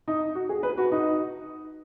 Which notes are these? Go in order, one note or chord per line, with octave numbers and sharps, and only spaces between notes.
D#4
F#4
G#4
B4
F#4
D#4